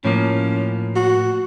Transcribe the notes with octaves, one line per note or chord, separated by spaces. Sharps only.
A2 F3 A#3 C#4
F#4